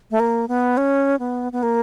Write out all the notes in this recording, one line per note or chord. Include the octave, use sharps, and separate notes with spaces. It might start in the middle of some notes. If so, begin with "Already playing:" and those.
A3
A#3
B3
C#4
B3
B3
A#3